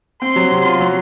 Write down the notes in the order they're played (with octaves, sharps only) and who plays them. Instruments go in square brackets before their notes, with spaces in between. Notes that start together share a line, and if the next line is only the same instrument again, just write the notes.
[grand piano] C4 [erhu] C6
[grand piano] F#3
C3
F4
F#3